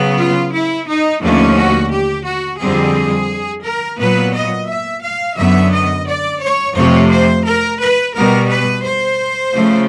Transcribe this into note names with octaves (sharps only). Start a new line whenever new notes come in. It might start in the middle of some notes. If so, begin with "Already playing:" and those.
Already playing: C#3 F#3 B3
F4
E4
D#4
D#2 D3 F3 A3 C#4
F#4
G4
F#4
F2 D3 G3 C4 G#4
A#4
A#2 F#3 B3 B4
D#5
E5
F5
F#2 D3 F#3 B3 E5
D#5
D5
C#5
F2 C3 F3 A3 C4 C#5
C5
A#4
B4
B2 G3 B3 A#4
B4
C5
C#3 F3 A3